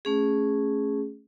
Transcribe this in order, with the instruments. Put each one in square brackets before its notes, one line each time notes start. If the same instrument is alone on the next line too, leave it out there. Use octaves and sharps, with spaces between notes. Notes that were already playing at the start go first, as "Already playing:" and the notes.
[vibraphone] A3 C#4 G#4